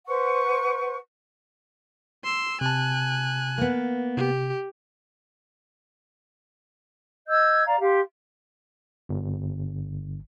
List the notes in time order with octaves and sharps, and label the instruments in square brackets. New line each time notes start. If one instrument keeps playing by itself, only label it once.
[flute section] B4 C5 F#5 C#6
[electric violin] C6 E6
[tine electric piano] C3 A5 [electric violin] G#5 F#6
[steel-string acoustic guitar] A#3 B3
[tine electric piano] C3 [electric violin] G4
[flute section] D#5 E6 G6 G#6
D5 F5 A#5
G4 F5 C6
[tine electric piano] G1